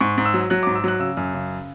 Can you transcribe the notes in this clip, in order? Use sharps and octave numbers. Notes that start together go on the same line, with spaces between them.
G#2 C#6
G#2
E6
F#3
F#3 F#6
G#2 D6
E6
F#3 F#6
C#3 E6
F#2
C#3